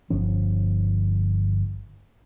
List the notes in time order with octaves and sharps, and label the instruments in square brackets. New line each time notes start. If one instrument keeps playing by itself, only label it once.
[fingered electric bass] G1 F3 C#4